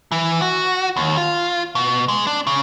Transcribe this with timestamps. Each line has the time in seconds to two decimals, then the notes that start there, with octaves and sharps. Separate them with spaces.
0.12 E3
0.42 F#4
0.96 D#2
1.17 F4
1.75 B2
2.08 G#3
2.27 D4
2.47 C#3